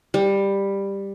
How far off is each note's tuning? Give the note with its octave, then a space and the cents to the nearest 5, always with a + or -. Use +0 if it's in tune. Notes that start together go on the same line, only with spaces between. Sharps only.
G3 +10